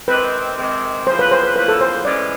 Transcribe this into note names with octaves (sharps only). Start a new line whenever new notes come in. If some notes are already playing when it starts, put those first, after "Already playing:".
C3 D#3 G#3 C4 B4
C3 D#3 G#3 C4
E2 C#3 F3 A#3 C5
B4
C5
B4
E2 C#3 F3 A#3 B4
A4
C5
A2 E3 G#3 C#4 D5